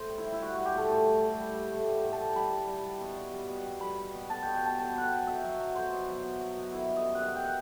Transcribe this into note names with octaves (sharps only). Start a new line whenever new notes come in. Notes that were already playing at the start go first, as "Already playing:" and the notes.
Already playing: A2 C5 G5
G3
E4
G3
E4
G3 F#4
G3 F#4
G4
A2 A4
A2 G4
G3
A2
G3
G3
A2
G3
A2
A5
G3
G3 B5
G3
G3
G3
B2
G3
G3
B2
G3
G3 B5
G3
B2
B2 A5
B2 G5
G5
G3 A5
F#3 A5
B2 F#5
G5
B2
B2 E5
F#3
F#3
F#3 C5
B2
F#3
B2
F#3
B2
D#3 E4
G3
D#5
F#2
F#5
D#3 E5
G5
F#5